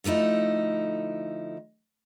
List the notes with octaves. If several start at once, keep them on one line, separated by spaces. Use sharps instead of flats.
D3 F3 A3 D#4 E4